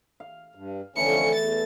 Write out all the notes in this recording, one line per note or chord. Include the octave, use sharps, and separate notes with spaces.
F5
G2
F2 D3 E3 A3 C#4 C#7
E2 A6